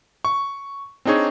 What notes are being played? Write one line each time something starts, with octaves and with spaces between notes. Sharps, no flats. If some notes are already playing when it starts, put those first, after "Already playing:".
C#6
C4 D4 D#4 G#4 C#5